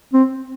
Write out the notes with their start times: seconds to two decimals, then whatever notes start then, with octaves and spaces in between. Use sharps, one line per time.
0.13 C4